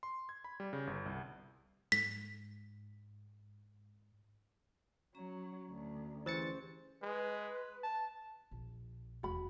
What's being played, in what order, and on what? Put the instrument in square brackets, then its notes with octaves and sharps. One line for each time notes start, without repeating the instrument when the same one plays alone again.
[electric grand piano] C6
G#6
B5
G3
C#3
G1
C2
[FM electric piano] G#2 [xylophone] B6
[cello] F#3 [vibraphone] C#4 A#5
[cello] D2
[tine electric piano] E3 A6 C#7 [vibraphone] C#4 G4 G#4 [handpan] C5
[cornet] G#3 [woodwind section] B4
[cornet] A5
[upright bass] A#1
[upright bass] E1 D#2 [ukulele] F#4 B5